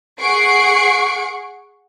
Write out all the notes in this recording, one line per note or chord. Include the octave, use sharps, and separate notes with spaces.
G#4 F#5 C#6 C7 D7